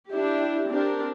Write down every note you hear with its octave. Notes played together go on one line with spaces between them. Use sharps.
D4 E4 G4
C4 D4 G4 A#4